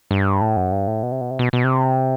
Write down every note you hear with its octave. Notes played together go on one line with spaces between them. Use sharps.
G2
A2
F#2
G2
A2
B2
C3
B2
C3
B2
B2
C3